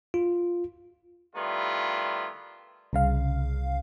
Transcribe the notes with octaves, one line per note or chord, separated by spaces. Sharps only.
F4
D#3 G3 A3 B3 E4 F4
C2 C#3 F5